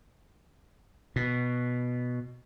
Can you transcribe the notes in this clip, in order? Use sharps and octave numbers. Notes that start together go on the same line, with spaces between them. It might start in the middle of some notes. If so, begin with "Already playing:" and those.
B2